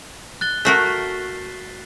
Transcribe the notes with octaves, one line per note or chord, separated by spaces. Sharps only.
F#6 A6 G7
A3 F#4 A#4 B6 C7